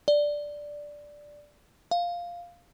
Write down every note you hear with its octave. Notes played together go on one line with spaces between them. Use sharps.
D5
F5